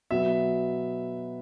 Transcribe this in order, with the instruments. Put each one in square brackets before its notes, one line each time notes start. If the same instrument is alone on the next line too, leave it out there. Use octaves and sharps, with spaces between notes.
[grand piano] B2 F#3 B3 E5